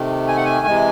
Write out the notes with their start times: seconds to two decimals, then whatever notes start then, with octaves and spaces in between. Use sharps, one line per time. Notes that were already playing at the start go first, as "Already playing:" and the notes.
Already playing: C3 D#3 A3
0.28 G#5
0.37 F#5
0.45 G#5
0.66 C3 E3 G#3